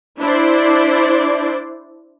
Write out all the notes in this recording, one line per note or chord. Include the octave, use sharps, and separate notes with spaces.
D4 E4 C5 D5